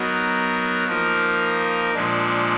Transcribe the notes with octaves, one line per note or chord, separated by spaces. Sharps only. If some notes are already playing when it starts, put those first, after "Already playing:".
Already playing: F#3 B3 D#4 A#4
F3 A#3 D#4 A#4
A#2 F3 G#3 D4